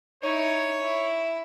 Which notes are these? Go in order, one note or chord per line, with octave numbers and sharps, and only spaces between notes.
D#4 E4 C#5
E4